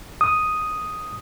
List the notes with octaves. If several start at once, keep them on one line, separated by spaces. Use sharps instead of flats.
D#6